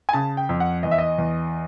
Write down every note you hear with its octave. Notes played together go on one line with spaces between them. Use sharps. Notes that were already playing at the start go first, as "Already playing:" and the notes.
G#5
C#3 A5
G5
F2
F#5
E2 D#5
E5
D#5
E2